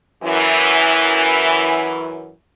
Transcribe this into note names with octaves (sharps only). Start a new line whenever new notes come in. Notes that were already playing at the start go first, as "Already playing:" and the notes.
F#2 E3